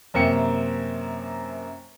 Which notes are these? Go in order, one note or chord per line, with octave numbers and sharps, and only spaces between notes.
F#2 C3 A#3 C4 G5 C#7